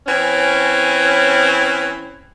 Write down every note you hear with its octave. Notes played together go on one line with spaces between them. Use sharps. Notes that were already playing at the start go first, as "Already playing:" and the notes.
E3 C4 C#4